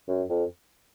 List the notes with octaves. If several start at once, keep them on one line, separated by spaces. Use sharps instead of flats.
F#2
F2